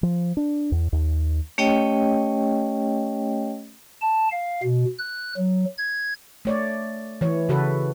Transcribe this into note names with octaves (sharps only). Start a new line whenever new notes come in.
F3
D4
E2
D#2
A3 C#4 G4 C#5 D#5 G5
A5
F5
B2
F#6
F#3
G#6
A3 C#5 D5
E3 C#5
C#3 F#4 A4 B4